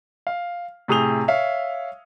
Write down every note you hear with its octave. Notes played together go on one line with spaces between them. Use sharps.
F5
A2 C3 G#4 D#6 F7 G7
C#5 E5 F5